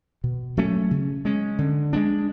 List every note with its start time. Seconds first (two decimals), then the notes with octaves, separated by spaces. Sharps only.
0.24 B2
0.57 F#3 A3 C#4
0.91 C#3
1.25 G#3 C#4
1.58 D3
1.93 G#3 B3 D4